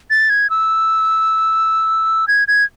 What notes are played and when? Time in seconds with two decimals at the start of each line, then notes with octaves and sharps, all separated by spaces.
0.10 A6
0.30 G#6
0.50 E6
2.28 G#6
2.48 G#6